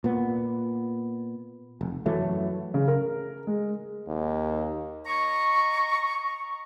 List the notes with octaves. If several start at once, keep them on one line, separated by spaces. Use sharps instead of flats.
A#2 B3
F1
F#2 E3 F#3 A3
C#3
A#4
G#3
D#2
D#5 A#5 C#6